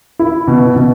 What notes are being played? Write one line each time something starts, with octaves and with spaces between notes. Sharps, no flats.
E4
B2
B2